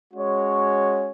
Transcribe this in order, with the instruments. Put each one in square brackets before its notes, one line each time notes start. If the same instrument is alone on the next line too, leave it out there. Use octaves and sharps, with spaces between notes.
[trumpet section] G#3 C#4 F#4 C#5